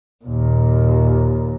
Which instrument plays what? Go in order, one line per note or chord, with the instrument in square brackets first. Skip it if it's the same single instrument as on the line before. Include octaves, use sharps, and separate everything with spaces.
[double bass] D#2 A#2